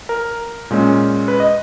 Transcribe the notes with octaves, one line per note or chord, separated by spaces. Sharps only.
A#4
A#2 G#3 C#4
B4
D#5